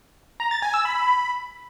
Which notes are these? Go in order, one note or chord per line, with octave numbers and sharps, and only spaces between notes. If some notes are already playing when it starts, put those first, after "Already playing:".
A#5
A6
G#5
E6
B5